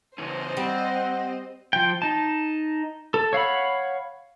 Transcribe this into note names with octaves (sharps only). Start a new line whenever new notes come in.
C#3 E3 C#4 C5 D#5
G3 C4 F#5
F3 G5
D#4 A5
A4
C#5 F5 F#5 B5